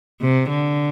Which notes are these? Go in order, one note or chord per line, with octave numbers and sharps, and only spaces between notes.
C3
D3